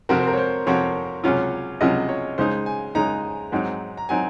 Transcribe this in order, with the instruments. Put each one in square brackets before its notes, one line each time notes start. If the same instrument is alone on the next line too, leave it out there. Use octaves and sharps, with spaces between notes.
[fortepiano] F2 C3 F3 C4 F#4 [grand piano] A#4
[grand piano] C5
A#4
C#5
C5
[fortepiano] F2 C3 F3 C4 F#4 [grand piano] C#5
[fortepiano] C#2 C3 F#3 C#4 F4
[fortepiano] C#2 C3 F#3 C#4 F4 [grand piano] D#5
[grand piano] C#5
[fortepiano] C#2 C#3 G#3 D#4 [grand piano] C5
[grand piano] G#5
[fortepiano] C#2 C#3 G#3 D#4 [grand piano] A#5
[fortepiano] G#2 F#3 C4 D#4
[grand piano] A#5
[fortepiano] F#3 C4 D#4 [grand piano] G#5